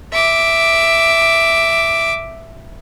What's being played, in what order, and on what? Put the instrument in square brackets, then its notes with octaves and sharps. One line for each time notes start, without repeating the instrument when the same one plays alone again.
[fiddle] E5 D6